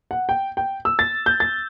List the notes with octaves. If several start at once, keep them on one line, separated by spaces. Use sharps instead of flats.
F#5
G5
G5
E6
A6
G6
A6